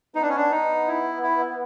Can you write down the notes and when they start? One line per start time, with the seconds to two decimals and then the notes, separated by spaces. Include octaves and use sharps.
0.15 B3 D#4
0.22 D4
0.29 C#4
0.36 D4
0.51 B3 D#4
0.87 E4
1.23 E4